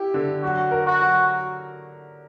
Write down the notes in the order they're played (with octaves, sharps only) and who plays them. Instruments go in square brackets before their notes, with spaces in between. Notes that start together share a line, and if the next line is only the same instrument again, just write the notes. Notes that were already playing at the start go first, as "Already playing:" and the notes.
Already playing: [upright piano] E4 G4
D3
[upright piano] F#3 [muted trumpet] F#4
[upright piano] A#4
[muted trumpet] F#4
[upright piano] F#3